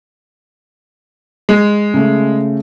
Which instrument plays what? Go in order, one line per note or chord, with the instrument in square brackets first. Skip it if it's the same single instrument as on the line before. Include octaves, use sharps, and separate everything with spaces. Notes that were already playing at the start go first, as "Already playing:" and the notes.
[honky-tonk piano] G#3
[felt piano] C#3 A3